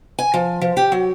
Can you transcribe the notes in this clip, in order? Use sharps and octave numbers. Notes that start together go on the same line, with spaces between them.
G#5
F3
F3
G4
F#3